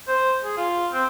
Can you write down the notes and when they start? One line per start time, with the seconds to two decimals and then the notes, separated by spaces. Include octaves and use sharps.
0.08 C5
0.44 G#4
0.57 F4
0.92 C4